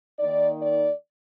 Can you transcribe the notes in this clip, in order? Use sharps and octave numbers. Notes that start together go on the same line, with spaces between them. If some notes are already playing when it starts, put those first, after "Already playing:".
D#3 A#3 D#4 D5
D5